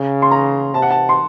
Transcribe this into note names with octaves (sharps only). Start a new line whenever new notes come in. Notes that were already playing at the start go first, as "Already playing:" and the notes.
Already playing: C#3
C6
A#5
C3 A5
F#5
A5
C6